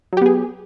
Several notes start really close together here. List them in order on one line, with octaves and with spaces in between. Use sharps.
F#3 G4 B3 G#4